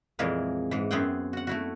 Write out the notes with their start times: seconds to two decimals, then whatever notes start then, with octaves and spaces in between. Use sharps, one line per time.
0.19 F2 A#2 E3 G#3 A#3 A#4
0.71 G#2 E3
0.91 F#2 B3 C4 G#4 F#5 G5
1.33 F#4 F#5
1.47 A3 E4 F#4